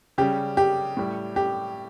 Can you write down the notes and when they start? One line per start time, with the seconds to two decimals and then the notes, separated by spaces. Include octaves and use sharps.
0.18 C#3 G3 G4
0.57 G4
0.97 A2 G3
1.36 G4